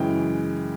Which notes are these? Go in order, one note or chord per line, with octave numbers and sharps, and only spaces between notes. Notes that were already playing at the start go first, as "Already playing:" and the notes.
Already playing: F#2 C#3 E3 G#3 G5